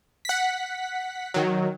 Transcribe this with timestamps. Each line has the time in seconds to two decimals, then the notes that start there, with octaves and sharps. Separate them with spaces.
0.25 F#5 B6
1.34 D#3 F#3